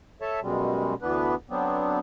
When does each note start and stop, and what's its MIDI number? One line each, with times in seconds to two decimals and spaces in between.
0.21 0.40 69
0.21 0.40 73
0.21 0.40 76
0.21 0.40 81
0.42 0.94 42
0.42 0.94 47
0.42 0.94 55
0.42 0.94 56
1.02 1.35 38
1.02 1.35 52
1.02 1.35 59
1.02 1.35 62
1.02 1.35 71
1.50 1.99 50
1.50 1.99 54
1.50 1.99 59
1.50 1.99 60
1.50 1.99 62